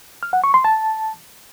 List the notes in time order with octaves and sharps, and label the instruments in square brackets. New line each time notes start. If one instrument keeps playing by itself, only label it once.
[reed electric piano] F6
F#5
C#6
C6
A5